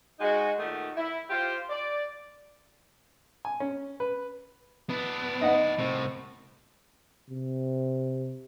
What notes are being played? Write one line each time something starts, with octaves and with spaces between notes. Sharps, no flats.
G#3 D#4 F#4
A#2 D#3 A3 D#4 F#4 G4
E4
F4 G4 C5
D5
G#5
C#4
B4
B3 D4 E4
D#4 F#5
C2 A2 C4
C3